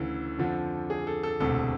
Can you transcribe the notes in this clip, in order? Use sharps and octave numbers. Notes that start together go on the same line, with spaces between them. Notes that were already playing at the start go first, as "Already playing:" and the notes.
Already playing: D2 C#3 E3 A4
F2 D3 F3
G#4
A4
A4
E1 D2 C3 A4